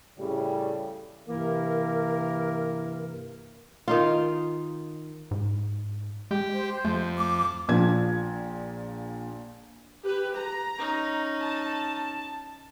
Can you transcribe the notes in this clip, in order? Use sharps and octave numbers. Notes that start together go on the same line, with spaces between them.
A2 C#3 G3
G2 C3 E3 A#3 E4 A#4
D#3 D#4 F4
G#2
G#3 G4
C5
F2 A3
D6
A#1 A#2 F3 G#6
G4 B4
A#5
C#4 D#4
A5